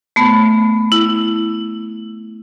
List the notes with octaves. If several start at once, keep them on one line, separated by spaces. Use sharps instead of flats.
A3 B3
E4